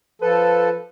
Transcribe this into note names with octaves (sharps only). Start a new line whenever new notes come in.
F3 A4 B4